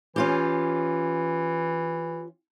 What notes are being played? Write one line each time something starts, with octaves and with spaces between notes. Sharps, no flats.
E3 C#4 F4 G4